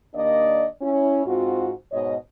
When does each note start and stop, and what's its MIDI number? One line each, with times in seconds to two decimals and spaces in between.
0.14 0.66 39
0.14 0.66 58
0.14 0.66 62
0.14 0.66 74
0.14 0.66 75
0.81 1.22 61
0.81 1.22 64
1.25 1.71 44
1.25 1.71 60
1.25 1.71 65
1.25 1.71 66
1.92 2.14 44
1.92 2.14 47
1.92 2.14 73
1.92 2.14 75